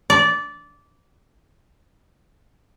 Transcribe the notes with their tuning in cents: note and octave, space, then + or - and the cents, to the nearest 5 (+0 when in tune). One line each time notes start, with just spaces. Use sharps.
D5 -15